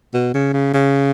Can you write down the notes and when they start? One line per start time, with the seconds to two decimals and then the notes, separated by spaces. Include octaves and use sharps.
0.14 B2
0.34 C#3
0.53 C#3
0.74 C#3